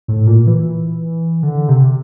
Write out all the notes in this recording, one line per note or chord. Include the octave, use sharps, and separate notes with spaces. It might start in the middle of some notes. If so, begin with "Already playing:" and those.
A2
A#2
E3
D3
C3